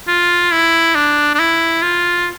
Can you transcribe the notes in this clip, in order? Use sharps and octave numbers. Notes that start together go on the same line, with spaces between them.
F4
E4
D4
D4
E4
F4